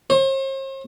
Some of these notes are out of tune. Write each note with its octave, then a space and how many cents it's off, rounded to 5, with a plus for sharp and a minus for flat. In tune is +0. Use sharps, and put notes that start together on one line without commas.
C5 +45